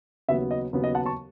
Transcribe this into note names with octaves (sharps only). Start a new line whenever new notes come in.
D#2 C#3 F#3 B3 E5
D#5
D#2 C#3 F#3 B3
D#5
F#5 A5
A5 C#6